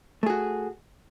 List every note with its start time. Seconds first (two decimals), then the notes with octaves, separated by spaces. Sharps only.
0.23 A3
0.26 G#4
0.30 F#4